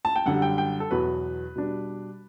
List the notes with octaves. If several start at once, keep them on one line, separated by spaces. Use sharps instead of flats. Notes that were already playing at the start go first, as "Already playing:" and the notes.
A5
G5
F#2 D3 G3 F#5
G5
G5
A4
E2 B2 F#3 B4
B2 G3 D4